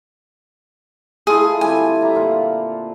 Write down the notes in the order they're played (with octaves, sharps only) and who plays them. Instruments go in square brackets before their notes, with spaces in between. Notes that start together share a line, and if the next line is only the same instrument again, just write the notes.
[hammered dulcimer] A3 E4 F4 [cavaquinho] G#4
[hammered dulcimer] D3 G3 C4 [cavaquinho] G#5
[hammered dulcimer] G4 E5 A#5
A#2 F4 F#5